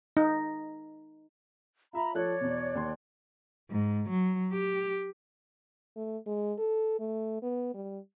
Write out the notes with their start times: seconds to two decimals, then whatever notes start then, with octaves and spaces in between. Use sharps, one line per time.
0.17 D#4
1.93 F4 E5 A#5 B5
2.15 F3 A4 C#5 D5 F#6
2.41 E2 B2
2.75 D#2 C6
3.70 G#2
4.10 F#3
4.53 G4
5.96 A3
6.26 G#3
6.59 A4
7.00 A3
7.42 B3
7.74 G3